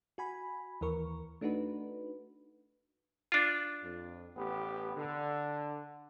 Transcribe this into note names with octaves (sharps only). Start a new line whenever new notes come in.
F#4 G#5 B5
D#2 E3 A#4 C#6
A3 D4 D#4 F#4 B4
D4 F4
F2
A1 B3 G4
D3